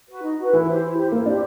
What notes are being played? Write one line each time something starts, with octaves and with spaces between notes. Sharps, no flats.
F#4 B4
D#4
F#4 B4
E3 E4
G4 C5
E4
G4 C5
A#3 E4
D4 G4 C5